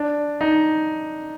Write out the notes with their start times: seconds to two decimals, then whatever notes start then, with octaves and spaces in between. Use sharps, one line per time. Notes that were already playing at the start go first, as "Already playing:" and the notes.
Already playing: D4
0.41 D#4